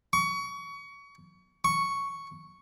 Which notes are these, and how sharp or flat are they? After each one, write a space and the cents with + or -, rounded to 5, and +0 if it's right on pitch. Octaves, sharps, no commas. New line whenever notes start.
C#6 +25
C#6 +0